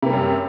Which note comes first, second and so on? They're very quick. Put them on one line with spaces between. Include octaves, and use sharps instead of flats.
C3 A#3 G3 F#2